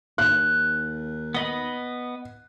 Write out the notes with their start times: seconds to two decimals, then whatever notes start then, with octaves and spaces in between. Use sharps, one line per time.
0.18 D#2 F#6
1.35 B3 D#5 B5